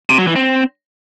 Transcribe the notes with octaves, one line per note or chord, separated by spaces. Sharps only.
C3
F#3
E3
C4